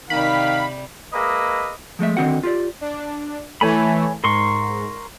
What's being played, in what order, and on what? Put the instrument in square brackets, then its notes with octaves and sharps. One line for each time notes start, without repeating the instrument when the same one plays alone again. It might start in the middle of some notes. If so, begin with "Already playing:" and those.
[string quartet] C3 G3 [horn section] D#3 [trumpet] F5 [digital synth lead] B5
[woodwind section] G#3 A#3 B4 D#5 E5
[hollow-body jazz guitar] F3 G#3 A3 E5
D3 D#3 C4 F#4 F#5
F4 G4 D5
[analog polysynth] D4
[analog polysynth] E3 A3 [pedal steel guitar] C#5 G#5 B5
[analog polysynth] G#2 [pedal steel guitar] A#4 C6 C#6